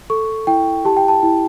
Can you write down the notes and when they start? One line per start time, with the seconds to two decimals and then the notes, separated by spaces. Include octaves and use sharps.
0.10 A4 C#6
0.47 E4 G5
0.85 G4 A5
0.97 G5
1.08 A5
1.23 E4